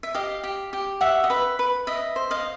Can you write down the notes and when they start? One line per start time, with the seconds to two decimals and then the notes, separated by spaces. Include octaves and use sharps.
0.03 E5
0.15 G4 D#5 F5
0.44 G4
0.73 G4
1.01 F#4 E5 F#5
1.24 D#5
1.30 B4 E5
1.59 B4
1.87 D#5 E5
2.16 C5
2.31 D#5 F5